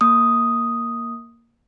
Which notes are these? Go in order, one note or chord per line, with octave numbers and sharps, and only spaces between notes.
A#3 D#6